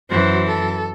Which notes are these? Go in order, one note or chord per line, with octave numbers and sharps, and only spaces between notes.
F#2 E3 F#4 C5
A4